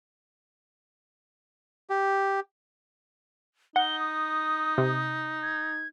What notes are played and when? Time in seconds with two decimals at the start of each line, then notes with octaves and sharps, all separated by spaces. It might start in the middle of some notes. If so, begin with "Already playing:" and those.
1.90 G4
3.76 D#4 F#5 G7
3.99 D#6
4.78 C3
5.43 G#6